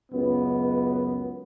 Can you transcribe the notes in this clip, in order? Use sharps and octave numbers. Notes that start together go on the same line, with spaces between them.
C#2 F#2 B3